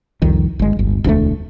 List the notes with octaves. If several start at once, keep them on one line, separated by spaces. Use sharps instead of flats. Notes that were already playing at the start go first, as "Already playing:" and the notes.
C2 F2 D#3
G1 G#3
D1 G1
E1 D2 B2 A3